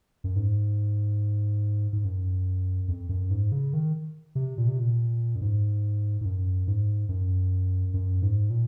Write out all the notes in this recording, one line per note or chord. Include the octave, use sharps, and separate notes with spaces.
F#2
G#2
G#2
F#2
F2
F#2
G#2
C#3
D#3
C3
A#2
C3
A#2
F#2
G#2
G#2
F#2
G#2
F#2
F#2
G#2
A#2